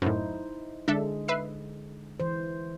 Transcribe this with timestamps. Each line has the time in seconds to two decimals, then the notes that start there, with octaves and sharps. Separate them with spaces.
0.02 F#2 A2 D#4 E4 C5
0.88 D3 G#3 D4 A4 E5
1.28 B4 E5 C7
2.20 E3 C5